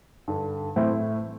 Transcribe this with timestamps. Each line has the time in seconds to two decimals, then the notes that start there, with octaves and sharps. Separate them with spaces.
0.28 G2 D3
0.76 A2 E3 C4 E4